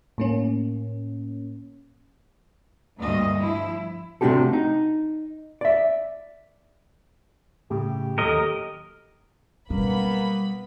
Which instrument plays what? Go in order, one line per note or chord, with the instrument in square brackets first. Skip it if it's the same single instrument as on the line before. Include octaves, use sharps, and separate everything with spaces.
[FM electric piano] A2 A#3 C#4
[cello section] D2 G2 A#2 D#5
F3 E4
[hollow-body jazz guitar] C3 A3 D4 F#4 G4 A4
D#4
D5 E5
[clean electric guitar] A2 C#3 [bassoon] G4
[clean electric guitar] D#2 F#3 [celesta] A4 D#6 [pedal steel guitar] A#4 D#5
[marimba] B2 F#3 C#4 [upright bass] G3 [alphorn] A#3 [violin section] B3 B5